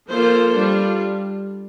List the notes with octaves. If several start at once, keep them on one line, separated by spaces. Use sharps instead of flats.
F3 A#3 F4 A4 C5
G3 D4 F4